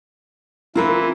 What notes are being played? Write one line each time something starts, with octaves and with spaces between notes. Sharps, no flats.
E3 C4 F4 A#4 B4